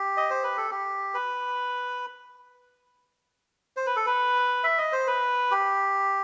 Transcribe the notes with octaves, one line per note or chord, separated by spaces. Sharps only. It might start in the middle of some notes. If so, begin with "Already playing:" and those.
Already playing: G4
D#5
C5
B4
A4
G4
B4
C5
B4
A4
B4
E5
D#5
C5
B4
G4